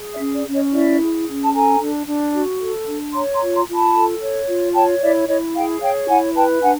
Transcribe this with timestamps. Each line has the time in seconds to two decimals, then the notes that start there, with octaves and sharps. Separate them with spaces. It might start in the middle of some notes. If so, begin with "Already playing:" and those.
Already playing: G#4
0.13 D5 E5
0.19 C#4
0.34 D5
0.46 C#4
0.53 C#5 D#5
0.73 E4 D5 E5
1.00 G#4
1.27 C#4
1.42 A5
1.53 A4 G#5 A#5
1.80 D4
2.07 D4
2.34 F#4
2.61 A4
2.87 D4
3.13 C#5 A#5 C6
3.33 A#5 C6
3.41 F4
3.53 A#5 C6
3.68 F4
3.74 A5 B5
3.94 A4
4.21 C#5
4.48 F4
4.74 C#5 G5 A5
5.01 E4 D5 E5
5.28 E4 C#5 D#5
5.54 G#4 F5 G5
5.81 C#5 F5 G5
6.08 E4 F#5 G#5
6.35 B4 G5 A5
6.61 D4 F#5 G#5